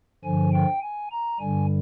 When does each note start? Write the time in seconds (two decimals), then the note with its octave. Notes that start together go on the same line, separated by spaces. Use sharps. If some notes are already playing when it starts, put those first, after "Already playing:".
0.24 G2 D3 F3 G#5
0.53 G5
0.82 G#5
1.12 A#5
1.40 G2 D3 G3 G#5